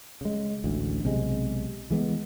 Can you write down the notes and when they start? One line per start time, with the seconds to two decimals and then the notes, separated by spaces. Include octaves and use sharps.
0.21 C#3 G#3
0.64 A1 D2
1.03 B1 C3 G#3
1.90 E3 G#3 B3